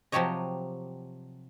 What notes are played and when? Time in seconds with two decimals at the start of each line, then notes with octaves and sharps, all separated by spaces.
0.12 C3 F3 F#3 G4 C#5 D#5